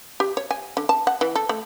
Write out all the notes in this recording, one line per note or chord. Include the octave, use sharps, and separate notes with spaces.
G4
C#5
G#5
D3
A5
F#5
E3
A4
A3